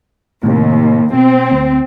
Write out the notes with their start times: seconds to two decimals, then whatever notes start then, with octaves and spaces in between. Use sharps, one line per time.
0.43 D#2 A2 C3
1.14 B2 C4
1.52 D2